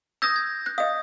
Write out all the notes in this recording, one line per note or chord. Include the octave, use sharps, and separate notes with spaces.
D#6 E6 G6 G#6 A#6
G#6
F#6
D#5 F5 D#6